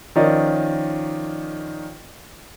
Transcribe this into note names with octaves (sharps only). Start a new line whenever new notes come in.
D#3 F3 C#4 A#4 D5 D#5